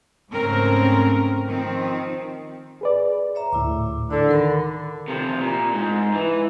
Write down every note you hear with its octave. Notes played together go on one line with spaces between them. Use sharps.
G#2 C#3 A3 C4 C#4 A#4
D#3 F3 C4
G#4 B4 D5
C#5 E5 A#5
D2 A2 E4 D6
D3 D4
D#3 A4 A#4 B5
C3 F3
A#2
G#2
E3